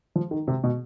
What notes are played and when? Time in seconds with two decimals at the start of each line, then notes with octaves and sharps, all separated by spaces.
0.16 F3
0.31 D#3
0.48 C3
0.64 B2